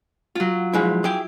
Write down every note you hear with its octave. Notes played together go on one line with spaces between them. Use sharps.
F#3 F4
F3 G#3 E4
E4 G#4 G5